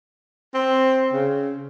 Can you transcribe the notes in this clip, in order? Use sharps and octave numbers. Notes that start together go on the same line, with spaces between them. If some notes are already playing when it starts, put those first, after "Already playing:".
C4
C#3